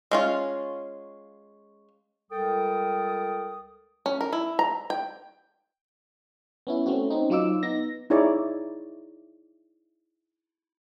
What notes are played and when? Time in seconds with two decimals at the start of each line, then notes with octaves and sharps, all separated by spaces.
0.11 G#3 C#4 F4
2.31 C#2 G3 A4 A#4 G5 D#6
4.06 C#4
4.21 A#4
4.33 E4
4.59 A#5
4.90 G5
6.67 B3 C#4 E4
6.86 A3 C4 C#4 F#4
7.10 C4 C#4 D#4
7.30 F#3 D#4 F4 D6 E6
7.63 B3 D#4 A#6
8.10 D#4 E4 G#4 C#5 D5